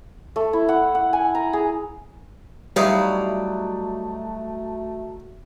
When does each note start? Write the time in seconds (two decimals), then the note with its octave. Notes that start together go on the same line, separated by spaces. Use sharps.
0.36 A3
0.53 E4
0.69 F#5
0.95 F#5
1.13 G#5
1.35 A#5
1.53 G#4
2.76 F#3 G3 A3 D#4 E4 D5 F5